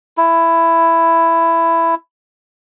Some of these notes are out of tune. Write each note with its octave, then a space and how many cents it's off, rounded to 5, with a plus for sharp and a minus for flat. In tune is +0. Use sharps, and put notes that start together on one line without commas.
E4 +10